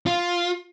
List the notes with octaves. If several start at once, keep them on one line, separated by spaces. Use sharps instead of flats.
F4